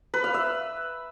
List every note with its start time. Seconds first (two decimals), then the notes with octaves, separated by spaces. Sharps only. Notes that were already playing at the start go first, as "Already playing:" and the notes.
0.14 B4
0.24 F5
0.34 E5